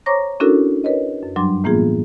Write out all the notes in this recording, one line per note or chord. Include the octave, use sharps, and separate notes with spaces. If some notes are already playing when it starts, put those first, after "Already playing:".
C5 C#5 A#5 C#6 D6 A#6
C#4 D4 E4 F#4 A4 A#4
A#4 B4 C#5 D#5
F#2
G2 F#3 G3 D4 C6 D6
A2 E3 A#3 B3 F4 G#4